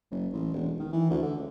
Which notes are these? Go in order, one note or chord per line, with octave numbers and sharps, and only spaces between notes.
F#1
A1
E1
D#3
E3
D2
D3
C#2